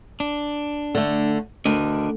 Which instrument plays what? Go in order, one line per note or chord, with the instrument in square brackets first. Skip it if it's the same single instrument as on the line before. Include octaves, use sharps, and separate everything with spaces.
[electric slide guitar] D4
[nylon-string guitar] D3 A3
[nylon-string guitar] D2 [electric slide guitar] D4 A#4 D#5